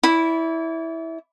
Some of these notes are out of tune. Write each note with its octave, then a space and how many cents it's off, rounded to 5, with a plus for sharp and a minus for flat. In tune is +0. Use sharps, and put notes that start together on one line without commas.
E4 -10 D5 -40